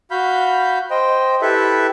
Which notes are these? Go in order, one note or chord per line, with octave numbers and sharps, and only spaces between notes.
F#4 F5 B5 G6
C5 D#5 G5
E4 G4 A4 B4 E5